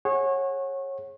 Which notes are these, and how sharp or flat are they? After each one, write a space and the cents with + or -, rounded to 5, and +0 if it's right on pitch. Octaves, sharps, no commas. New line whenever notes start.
G#4 +0 C#5 -25 F#5 +0